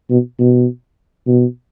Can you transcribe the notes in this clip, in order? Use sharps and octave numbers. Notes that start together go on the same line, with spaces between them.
B2
B2
B2